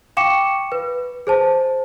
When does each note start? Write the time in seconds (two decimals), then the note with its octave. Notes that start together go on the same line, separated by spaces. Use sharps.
0.17 F5 G5 C#6 D6 C#7 E7
0.72 B4
1.27 G#4 C5 A5